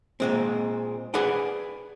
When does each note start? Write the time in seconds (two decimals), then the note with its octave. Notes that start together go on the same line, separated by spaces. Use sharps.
0.20 A#2 G#3 C4
1.14 G#4 B4 D5 F#5 G5